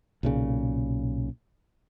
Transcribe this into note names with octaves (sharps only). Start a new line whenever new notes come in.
B1 A#2 C#3